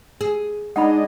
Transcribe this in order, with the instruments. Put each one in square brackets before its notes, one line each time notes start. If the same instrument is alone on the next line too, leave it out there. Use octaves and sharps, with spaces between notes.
[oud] G#4
[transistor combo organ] G#3 D4 D#5 [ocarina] D#4 [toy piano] F#5 B5